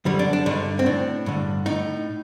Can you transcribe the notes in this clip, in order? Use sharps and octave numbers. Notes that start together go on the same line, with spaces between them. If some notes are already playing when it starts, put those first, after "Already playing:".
F#2 D3 G3
D4
D4
G2 D3 D#4
C4
A2 D4
G2 D3
A2 D#4